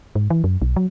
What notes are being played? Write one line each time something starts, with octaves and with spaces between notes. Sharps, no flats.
G#2
E3
F#2
B1
F#3